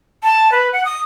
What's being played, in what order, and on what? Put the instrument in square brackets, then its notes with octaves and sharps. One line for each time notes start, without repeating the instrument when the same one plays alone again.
[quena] A5
B4
F#5
D#6